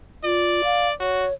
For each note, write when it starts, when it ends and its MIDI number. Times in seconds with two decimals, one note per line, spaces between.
0.24 0.62 65
0.24 0.93 74
0.64 0.88 77
1.00 1.27 66
1.00 1.33 73